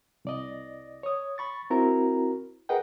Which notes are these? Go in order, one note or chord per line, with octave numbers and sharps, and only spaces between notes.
C2 D5 D#5
C#5 D#6
B5 C#6 A6
C4 E4 F#4 A#4 A#5
G#4 A#4 B4 D#5 F#5 G5